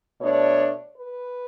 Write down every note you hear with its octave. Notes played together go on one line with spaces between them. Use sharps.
B2 A3 D4 C#5
B4